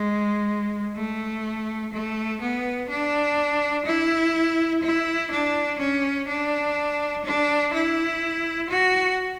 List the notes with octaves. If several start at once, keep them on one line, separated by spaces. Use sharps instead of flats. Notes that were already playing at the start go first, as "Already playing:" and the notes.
Already playing: G#3
A3
A3
B3
D4
E4
E4
D4
C#4
D4
D4
E4
F#4